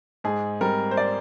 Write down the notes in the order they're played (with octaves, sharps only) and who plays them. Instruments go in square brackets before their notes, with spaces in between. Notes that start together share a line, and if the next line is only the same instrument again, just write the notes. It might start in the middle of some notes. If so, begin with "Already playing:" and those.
[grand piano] G#2 G#4
G3 C4 A#4
C5
D5